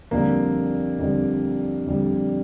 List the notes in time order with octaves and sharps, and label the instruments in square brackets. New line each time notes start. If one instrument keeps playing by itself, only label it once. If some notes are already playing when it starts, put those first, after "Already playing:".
[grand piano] F2 D3 G3 A#3
F2 D3 G3
F2 D3 G3